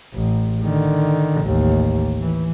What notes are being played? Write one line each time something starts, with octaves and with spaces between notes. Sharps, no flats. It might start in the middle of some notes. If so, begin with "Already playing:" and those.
A1
D3 D#3
A1 D#2
E3